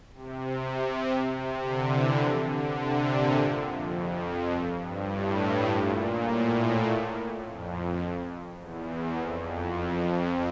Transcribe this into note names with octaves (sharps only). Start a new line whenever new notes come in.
C3
C3
C3
C3
D3
E3
F3
D3
C3
A#2
G2
F2
F2
G2
G2
A2
A#2
A2
F2
F2
E2
F2